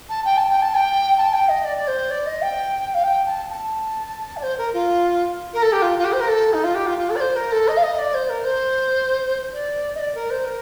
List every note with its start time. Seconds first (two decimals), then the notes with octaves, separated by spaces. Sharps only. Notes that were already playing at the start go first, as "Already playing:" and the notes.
0.09 A5
0.25 G5
0.37 A5
0.49 G5
0.61 A5
0.74 G5
1.17 A5
1.33 G5
1.48 D#5
1.64 D5
1.76 D5
1.87 C5
2.10 D5
2.25 D#5
2.41 G5
2.94 F5
3.03 G5
3.26 A5
3.50 A5
4.36 D5
4.42 C5
4.57 A#4
4.73 F4
5.53 A#4
5.62 A4
5.72 G4
5.81 F4
5.98 F4
6.04 G4
6.12 C5
6.20 A#4
6.27 A4
6.53 D#4
6.63 F4
6.74 G4
6.86 F4
6.97 F4
7.09 A4
7.15 D5
7.20 C5
7.35 A#4
7.51 A4
7.67 D#5
7.76 F5
7.82 D#5
7.98 D5
8.13 C5
8.29 A#4
8.44 C5
9.52 D5
9.94 D#5
9.99 D5
10.14 A#4
10.30 C5
10.45 A#4